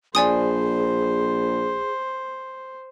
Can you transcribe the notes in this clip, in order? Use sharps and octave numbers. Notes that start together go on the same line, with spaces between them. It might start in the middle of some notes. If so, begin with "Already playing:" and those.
A#1 G#4 C5 D5 G#5 D#6